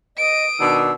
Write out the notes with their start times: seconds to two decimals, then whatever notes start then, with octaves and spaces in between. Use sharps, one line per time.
0.17 D#5 D#6 D7
0.60 B2 D#3 D4 E6